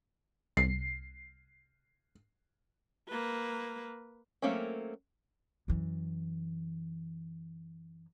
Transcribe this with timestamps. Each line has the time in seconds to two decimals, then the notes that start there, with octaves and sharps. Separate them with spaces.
0.57 C2 C7
3.08 A#3 B4
4.42 F#3 A3 A#3 C4 C#4
5.68 F#2 E3